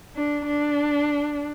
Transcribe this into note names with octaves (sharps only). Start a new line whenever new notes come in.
D4
D4